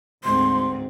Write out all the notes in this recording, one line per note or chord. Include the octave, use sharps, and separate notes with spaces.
D2 G#2 C4 C6